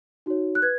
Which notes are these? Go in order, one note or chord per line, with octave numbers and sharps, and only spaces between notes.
D#4 F#4 C#5
F#6
B4 G#6